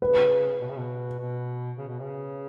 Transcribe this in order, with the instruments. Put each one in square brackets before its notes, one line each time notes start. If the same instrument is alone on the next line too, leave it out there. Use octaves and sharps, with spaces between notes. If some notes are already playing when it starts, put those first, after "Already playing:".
[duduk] C#3 [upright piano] B4
[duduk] B2
C#3
B2
B2
C#3
B2
C#3